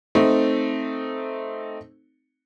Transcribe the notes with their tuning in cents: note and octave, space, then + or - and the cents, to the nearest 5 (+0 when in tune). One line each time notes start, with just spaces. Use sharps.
A3 +0 C4 +0 D#4 +0